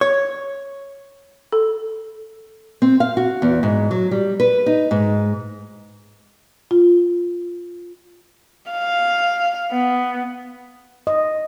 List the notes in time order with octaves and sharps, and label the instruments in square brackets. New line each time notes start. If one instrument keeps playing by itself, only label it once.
[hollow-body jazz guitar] C#5
[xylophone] A4
[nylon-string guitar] C4
F5
F#4
E2
G#2
F#3
G3
B4
D#4
G#2
[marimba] F4
[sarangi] F5
B3
[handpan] D#5